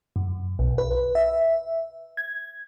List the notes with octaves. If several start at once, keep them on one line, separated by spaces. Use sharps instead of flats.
F#2
B1
B4
E5
G#6